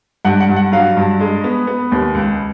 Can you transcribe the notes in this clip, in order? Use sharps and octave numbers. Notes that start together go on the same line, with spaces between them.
G2 F#5
F#5
G2
F#5
F#3 F5
G2
G#3
B3
B3
D#2
C#2